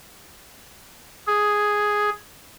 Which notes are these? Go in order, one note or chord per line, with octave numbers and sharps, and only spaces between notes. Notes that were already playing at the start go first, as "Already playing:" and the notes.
G#4